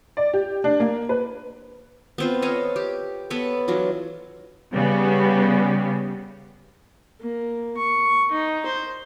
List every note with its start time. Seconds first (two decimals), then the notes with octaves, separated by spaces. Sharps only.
0.17 D5
0.34 G4
0.64 D4
0.80 A#3
1.09 B4
2.18 B3 C4 F4
2.42 A4 C#5 D#5 F5
2.76 G4
3.30 B3 A4 B4 C#5
3.68 E3 F#3 D4 F4
4.73 C#3 G3 B3
7.20 A#3
7.77 C#6
8.32 D#4
8.66 C5